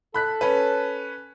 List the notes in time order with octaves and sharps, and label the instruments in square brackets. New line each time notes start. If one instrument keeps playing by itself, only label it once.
[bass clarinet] A4 [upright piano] B5 F#6 B6
[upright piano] C#4 B4